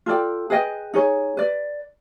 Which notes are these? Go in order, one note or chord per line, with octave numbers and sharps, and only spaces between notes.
F4 A4 D5 G5
G#4 B4 D#5 G5
D#4 G#4 C#5
B4 D5